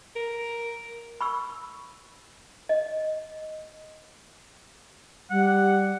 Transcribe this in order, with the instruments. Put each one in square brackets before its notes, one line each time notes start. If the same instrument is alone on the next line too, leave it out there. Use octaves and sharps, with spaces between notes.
[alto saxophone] A#4
[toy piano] B5 C#6 E6
D#5
[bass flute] G3 [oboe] F#5